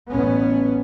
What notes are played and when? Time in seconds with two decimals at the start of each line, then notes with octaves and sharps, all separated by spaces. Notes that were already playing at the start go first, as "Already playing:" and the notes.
0.10 A1 B3 C#4